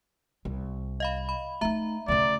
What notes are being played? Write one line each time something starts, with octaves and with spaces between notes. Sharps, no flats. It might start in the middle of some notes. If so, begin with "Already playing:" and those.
C2
D#5 F5 B5
B5
A3 D#4 E5 A#5
D2 C#3 D5